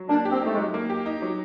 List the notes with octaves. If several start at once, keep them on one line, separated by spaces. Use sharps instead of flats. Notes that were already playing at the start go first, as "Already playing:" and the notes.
Already playing: F#3
A#3 D4
G4
C4
A3 D#4
G#3
F#3
A#3
G4
D#4
F#3